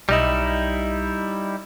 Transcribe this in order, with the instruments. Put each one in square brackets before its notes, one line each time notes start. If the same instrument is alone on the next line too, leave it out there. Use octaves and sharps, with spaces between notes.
[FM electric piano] B1 D#5 [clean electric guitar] G3 D#4 E4